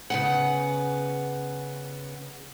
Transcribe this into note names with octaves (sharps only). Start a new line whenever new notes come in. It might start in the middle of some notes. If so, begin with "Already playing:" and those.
C#3 B3 F#5